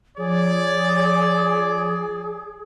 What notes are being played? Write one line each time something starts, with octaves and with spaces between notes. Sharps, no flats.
F3 G#4 C#5 D5